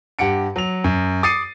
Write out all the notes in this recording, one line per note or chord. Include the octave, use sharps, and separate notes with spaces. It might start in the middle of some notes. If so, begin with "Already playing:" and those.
G2 G4 F#5 C#7 D7
F#3 F7
F#2
D6 D#6 A6 C7 C#7 D#7